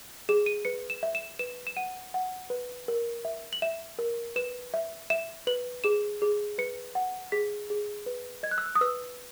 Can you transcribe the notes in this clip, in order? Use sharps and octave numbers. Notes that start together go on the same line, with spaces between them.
G#4 E7
D#7
B4 C#7
E7
E5
E7
B4 E7
E7
F#5 D#7
F#5
B4
A#4
E5
F#7
E5 E7
A#4
B4 E7
E5
E5 E7
B4 F#7
G#4 E7
G#4
B4 C#7
F#5
G#4 B6
G#4
B4
D#5 G#6
F#6
E6
F#6
D#6
B4 E6